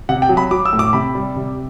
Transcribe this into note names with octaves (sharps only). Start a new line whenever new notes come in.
C3 F#5
G5
F#3
B5
F#3 D6
E6
A2
D6
C3 B5
G3
C3